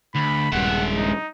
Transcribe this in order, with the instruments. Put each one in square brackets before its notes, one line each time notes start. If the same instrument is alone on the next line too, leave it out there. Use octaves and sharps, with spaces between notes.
[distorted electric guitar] D2 [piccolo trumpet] B5
[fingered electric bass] D#1 G2 [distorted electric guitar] G#3 E5 [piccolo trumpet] F#5
[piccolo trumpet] D#4